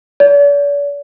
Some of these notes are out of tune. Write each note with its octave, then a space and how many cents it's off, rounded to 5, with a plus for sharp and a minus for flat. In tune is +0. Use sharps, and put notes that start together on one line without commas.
D5 -45